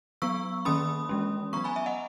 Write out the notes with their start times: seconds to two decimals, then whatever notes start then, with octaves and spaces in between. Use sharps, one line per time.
0.22 F#3 B3 C#6 E6
0.65 D#3 A#3 C#4 B5 D#6
1.09 E3 G#3 C#4
1.53 F#3 B3 A#5 C#6
1.64 G#5 B5
1.76 E5 G#5
1.86 D#5 F#5